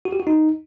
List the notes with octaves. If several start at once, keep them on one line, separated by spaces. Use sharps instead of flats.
F#4
G4
F#4
D#4